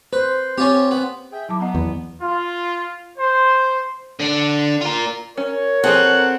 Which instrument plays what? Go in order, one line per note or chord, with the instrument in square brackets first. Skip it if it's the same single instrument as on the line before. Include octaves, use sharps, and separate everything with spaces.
[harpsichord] B4 [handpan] C5
[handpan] C4 [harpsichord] C#4 F4 G4
[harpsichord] B3
[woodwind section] G#4 E5 G5
[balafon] F#3 A5 D6 [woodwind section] E4
[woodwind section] B3 [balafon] D#5 F#5 A#5
[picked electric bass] E2
[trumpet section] F4
C5
[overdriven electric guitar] D3 D4
F4 A#4
[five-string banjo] C#4 [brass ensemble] A#4 C#5
[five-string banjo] F3 G#4 A4 [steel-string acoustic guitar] C4 [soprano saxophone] F#5